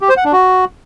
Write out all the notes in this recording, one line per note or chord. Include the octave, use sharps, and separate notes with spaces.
G4
C5
F#5
D4
F#4